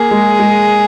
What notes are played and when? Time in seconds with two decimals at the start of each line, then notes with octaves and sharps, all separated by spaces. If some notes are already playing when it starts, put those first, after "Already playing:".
Already playing: A#3 G#4
0.11 G#3
0.40 G#3